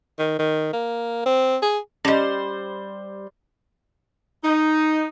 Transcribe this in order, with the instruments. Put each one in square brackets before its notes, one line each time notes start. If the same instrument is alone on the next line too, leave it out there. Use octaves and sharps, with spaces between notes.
[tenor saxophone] D#3
D#3
A#3
C4
G#4
[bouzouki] G3 C5 [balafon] C#4 D#5
[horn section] D#4